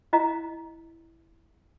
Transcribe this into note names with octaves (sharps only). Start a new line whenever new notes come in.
E4 D#5 F5 A#5